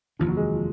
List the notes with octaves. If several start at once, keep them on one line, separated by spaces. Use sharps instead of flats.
F1 D#2 D3 F3
F#3
G#3
F3